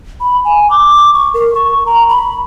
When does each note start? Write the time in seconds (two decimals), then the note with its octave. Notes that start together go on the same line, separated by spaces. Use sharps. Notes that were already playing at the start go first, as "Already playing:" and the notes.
0.20 B5
0.45 G#5
0.70 D6
1.13 C#6
1.34 A#4
1.55 C#6
1.86 A#5
2.09 B5